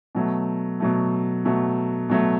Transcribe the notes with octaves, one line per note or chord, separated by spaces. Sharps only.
B2 F#3 A3
B2 F#3 A3
B2 F#3 A3
B2 F#3 A3